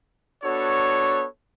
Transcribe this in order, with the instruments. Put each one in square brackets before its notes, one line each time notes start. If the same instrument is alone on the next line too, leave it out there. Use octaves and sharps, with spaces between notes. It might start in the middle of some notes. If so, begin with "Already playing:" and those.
[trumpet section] B3 D4 F#4 A4 C#5